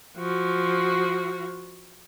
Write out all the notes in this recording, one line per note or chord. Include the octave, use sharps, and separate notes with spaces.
F3 F#4